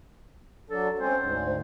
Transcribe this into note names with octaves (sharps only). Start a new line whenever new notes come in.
F#3 D4 A4
G#3 C4 C#4 C5
D2 G#2